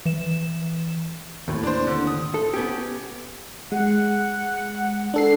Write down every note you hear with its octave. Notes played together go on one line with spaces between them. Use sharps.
E3 E7
D#2 A2
D4 C5
D3
D#6
A4
B3 C#4 G4
G#3 F#5
D4 A4 C7